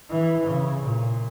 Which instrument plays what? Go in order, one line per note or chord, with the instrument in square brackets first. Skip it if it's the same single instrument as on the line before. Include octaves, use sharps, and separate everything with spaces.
[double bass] E3
C#3
A#2